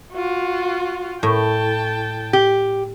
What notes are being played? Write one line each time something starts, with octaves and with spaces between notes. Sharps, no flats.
F4 F#4
A2 G5 A5
G4